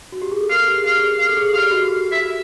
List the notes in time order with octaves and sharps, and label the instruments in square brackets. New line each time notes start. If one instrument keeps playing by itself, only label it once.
[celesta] F#4
G4
G#4
A4
[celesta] A#4 [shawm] F5
[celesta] G4
G#4
[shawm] F5
[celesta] G#4
[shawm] F5
[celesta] A4
G#4
[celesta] G4 [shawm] F5
[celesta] F#4
[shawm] E5